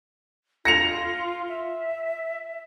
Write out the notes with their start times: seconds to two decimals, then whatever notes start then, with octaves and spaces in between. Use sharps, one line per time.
0.65 F4 A#6 C#7 F7
1.49 E5